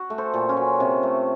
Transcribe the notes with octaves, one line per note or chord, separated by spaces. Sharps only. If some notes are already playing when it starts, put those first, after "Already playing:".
Already playing: F#4
A3
A4 C5
A#2
C#4 F4
F#3
C3
A3